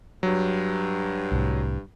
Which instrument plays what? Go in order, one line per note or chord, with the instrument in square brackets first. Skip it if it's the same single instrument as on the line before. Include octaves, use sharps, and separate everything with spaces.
[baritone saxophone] G2 [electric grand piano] F#3
[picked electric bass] C2 A2